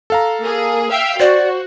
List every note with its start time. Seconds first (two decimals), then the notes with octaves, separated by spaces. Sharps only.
0.10 A4 F5 A#5
0.42 A#3 G#4
0.90 E5 F5 G5
1.20 F#4 C5 D5